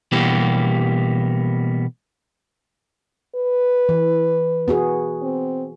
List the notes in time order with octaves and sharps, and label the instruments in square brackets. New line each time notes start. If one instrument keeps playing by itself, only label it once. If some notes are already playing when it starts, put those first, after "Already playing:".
[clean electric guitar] B2 E3 G3 A#3 B3 G4
[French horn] B4
[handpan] E3
B3 F#4 G#4
[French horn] C4